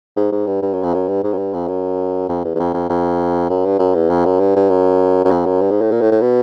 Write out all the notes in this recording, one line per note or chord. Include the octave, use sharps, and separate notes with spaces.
G#2
G#2
G2
G2
F#2
F2
F#2
G2
G#2
F#2
G2
F2
F#2
F2
E2
E2
F2
F2
F2
F#2
G2
F#2
E2
F2
F#2
G2
G2
F#2
F#2
F2
F#2
G2
G#2
A2
A#2
A2
A2
B2